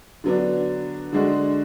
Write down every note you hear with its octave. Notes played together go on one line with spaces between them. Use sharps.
D3 F#3 B3 D4
D3 G#3 D4 F#4